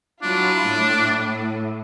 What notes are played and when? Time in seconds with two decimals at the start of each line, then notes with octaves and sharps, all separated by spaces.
0.23 F#3 D4 E4 F4
0.66 A2